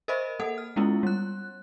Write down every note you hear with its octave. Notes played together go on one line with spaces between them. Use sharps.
A#4 C5 D#5 E5 B5
A#3 A4 F#5 D#6
F6
G#3 B3 C#4 E4 F4
G3 F#6